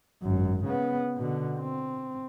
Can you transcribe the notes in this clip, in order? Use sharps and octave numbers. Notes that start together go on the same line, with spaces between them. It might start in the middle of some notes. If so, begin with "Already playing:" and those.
G#1 F#2
C#3 B3
B2 D3
C4